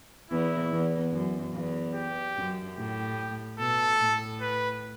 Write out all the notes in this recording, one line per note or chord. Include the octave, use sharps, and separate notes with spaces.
E2 E4
E2
F#2
E2
G4
F#2
A2 G4
B2 A4
A2
B4